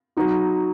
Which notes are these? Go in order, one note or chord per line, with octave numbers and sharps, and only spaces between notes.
F#3 D#4 F#4